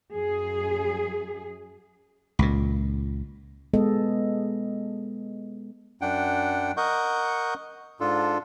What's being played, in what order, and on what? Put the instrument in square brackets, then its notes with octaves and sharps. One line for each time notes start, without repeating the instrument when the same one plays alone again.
[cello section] F#2 G#4
[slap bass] C#2 A#2
[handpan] G#3 B3 A4 D#5
[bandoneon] F#2 D4 F#5 G5
A#4 D#5 F#5 C#6 G6
G#2 D4 F4 A4